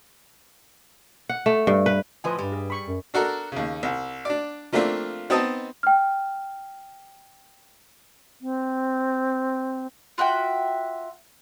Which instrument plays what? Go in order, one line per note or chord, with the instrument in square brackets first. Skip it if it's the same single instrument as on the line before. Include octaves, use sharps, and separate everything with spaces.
[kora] F#5
A3
G2
B4
[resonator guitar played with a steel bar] A2 F3 [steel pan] B4 D#5 G#5
[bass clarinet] G2 [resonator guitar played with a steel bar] G3
[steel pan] G#4
B5 C#6
[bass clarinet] F#2
[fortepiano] D4 F#4 A4 A#4
D#2 C#3
C2
D4 D5
F3 A3 A#3 C4 D4 F4
B3 C4 D#4 D#5 A5
[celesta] G5 F6
[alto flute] C4
[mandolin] F4 F#4 E5 G5